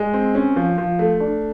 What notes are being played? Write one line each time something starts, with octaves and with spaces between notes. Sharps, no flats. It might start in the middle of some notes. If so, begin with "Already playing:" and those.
Already playing: G#3
C4
C#4
F3
F3
A3
D4